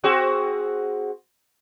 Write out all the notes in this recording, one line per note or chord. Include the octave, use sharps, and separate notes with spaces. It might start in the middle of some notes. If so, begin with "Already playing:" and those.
C4 F#4 G#4